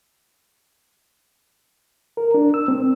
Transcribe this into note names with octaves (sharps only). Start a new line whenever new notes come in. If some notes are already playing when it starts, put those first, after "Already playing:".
A#4
D4
E6
C4